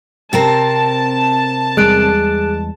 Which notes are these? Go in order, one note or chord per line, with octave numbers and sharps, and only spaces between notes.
C3 C4 A#4 A5
E2 G3 G#3 G#4 F#6 D7